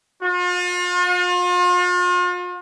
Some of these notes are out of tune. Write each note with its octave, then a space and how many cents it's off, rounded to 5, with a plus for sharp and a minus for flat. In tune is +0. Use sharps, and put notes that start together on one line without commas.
F4 +40